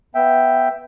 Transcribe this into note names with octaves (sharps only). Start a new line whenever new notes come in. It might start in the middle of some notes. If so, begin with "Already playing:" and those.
B3 E5 G5